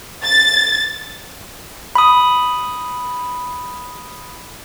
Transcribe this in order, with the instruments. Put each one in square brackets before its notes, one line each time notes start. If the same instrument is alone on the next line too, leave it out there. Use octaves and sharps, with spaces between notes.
[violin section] A6
[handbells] B5 D#6